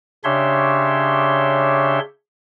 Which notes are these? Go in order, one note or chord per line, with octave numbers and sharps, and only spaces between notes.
C#3 D4 G4 C#5 E5 C6